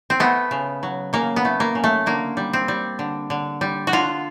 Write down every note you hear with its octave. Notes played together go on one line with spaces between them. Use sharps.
C4
A3 B3
C#3
F#3
C#3 A#3
B3
A3
A#3
C#3
A3
D3 A#3
G3
C4
G3
D3
D3
G3
F#4
D3 F4